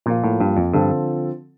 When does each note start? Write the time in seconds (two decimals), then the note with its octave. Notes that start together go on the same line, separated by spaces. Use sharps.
0.06 A#2 F3 A#3 F4
0.24 A2
0.40 G2
0.57 F2
0.73 G2 D3 F3 C4 F4 A4